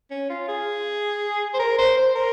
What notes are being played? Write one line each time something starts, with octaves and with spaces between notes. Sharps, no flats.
C#4
F4
G#4
C5
A#4
C5
C5
A#4